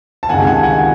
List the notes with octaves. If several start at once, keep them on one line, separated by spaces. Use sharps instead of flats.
A5
C#2 C3 D#3 F#5 G#5
F#5 G#5
F#5 G#5